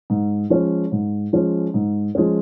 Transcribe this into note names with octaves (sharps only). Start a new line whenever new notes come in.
G#2
F3 G#3 C#4
G#2
F3 G#3 C#4
G#2
F3 G#3 C#4